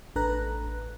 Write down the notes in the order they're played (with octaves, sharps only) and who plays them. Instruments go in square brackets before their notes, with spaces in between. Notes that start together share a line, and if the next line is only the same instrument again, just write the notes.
[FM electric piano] A1 D4 A4 B4 A#5 F#6